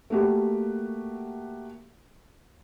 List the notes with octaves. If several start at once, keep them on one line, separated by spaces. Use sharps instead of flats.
A3 A#3 F#4 G4